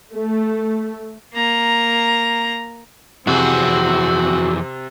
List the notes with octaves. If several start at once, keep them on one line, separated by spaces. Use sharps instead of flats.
A3
A#3 A#5
F2 C3 E3 C4 F#4 G#4